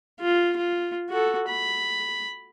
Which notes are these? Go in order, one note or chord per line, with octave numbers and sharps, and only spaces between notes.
F4
F4
F#4 A4
B5